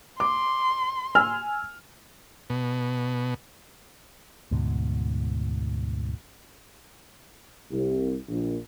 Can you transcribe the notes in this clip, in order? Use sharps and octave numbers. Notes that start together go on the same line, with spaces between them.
C6 D6
G#5 E6 F6
B2
D2 G#2 B2
C2
A#1